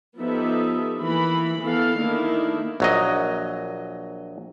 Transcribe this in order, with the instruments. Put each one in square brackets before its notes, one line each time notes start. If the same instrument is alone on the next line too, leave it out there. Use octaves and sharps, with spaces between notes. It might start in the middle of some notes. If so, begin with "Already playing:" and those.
[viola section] F3 B3 D#4 G4 A4 E5
E3 A#3 B5
E3 B3 A4 F5
D#3 A3 A#3 D4 E4
[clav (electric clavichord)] A#1 F#3 D#5